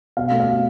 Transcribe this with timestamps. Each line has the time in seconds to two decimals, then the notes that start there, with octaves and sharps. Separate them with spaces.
0.17 B2 F5
0.31 A3
0.40 F5
0.47 B2